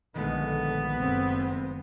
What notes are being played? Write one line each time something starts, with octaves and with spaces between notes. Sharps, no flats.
A#1 D3 D#3 G#3 A3 B3
F#1 C4